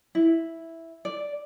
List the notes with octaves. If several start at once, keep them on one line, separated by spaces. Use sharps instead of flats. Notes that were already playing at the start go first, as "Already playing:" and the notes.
E4
D5